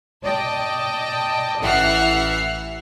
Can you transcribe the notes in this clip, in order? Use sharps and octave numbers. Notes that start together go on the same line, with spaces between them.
D5 D#5 G5 A5
A1 E3 E5 F#5 F6 C7